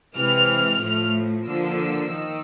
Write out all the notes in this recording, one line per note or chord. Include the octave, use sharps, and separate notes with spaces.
C3 E3 G#3 F6
A2 F3 A3
D3 F3 A#3 E6
D#3